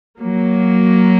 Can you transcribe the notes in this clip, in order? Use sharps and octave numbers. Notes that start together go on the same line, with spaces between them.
F#3 A#3